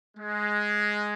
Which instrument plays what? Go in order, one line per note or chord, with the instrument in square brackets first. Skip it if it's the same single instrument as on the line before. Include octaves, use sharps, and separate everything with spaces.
[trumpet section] G#3